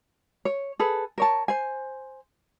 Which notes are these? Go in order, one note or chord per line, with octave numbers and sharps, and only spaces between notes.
C#5
G#4 A4 B4
A#4 C#5 A5
C5 G#5